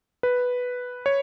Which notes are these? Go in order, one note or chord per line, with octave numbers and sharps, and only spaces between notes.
B4
C#5